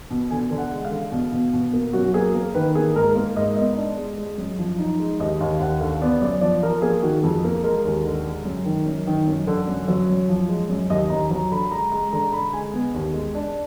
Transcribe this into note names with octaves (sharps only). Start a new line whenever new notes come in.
B2
D3 G#5
D3
F#5
G#3
F5
D3
B2
B2
B2
A#3
F#2 F#4
F#4
A#3 G#4
A#3 A#4
D#3 B4
A#3 G#4
G#2 A#4
A#3
G#2 D#5
B3 D#5
D4
G#3
G#3
F#2
F3
D#4
G#3
D#2 D#5
D#2 F5
D#2 F#5
D3 F5
B3 D5
F#2 D5
F3 D5
F3 A#4
A#3 G#4
D#3 F#4
F2 G#4
A#3
G#3 A#4
D#2
D3
G#3
F#2
D#3
F#2
D#3
F#2
D3
F#2
F#3
F#2
F3
G#3
F#2
D#2 D#5
D#2 A#5
F#3 A#5
D3 B5
G#3 A#5
G#3 A#5
D3 A#5
D3 B5
G#3 G#5
B3
D#2
G#3
D4